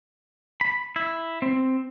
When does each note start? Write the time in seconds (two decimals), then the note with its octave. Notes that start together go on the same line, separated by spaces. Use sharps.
0.61 B5
0.96 E4
1.42 C4